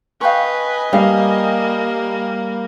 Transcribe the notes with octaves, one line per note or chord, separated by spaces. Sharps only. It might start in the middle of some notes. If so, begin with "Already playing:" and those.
B4 D#5 F5 G5 G#5 C#6
G3 A#3 F5